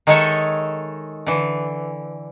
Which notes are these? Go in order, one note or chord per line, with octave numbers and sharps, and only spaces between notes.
D#3 G#3 D#4 A4 C#5 E5
D3 E3